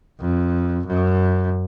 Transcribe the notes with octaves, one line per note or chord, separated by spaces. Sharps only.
F2
F#2